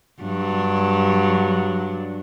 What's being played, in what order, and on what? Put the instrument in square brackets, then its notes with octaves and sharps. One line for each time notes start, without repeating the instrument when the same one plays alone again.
[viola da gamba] G2 F#3 D4